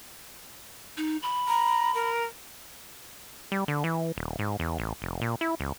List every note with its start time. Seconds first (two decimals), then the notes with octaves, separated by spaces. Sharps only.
0.97 D#4
1.23 B5
1.48 A#5
1.95 A#4
3.52 G3
3.68 D3
3.84 E3
4.17 D#1
4.39 G#2
4.60 E2
4.78 A1
5.02 F1
5.22 A#2
5.41 E4
5.60 C#2